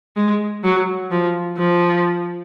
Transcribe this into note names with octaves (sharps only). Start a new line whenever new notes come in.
G#3
F#3
F3
F3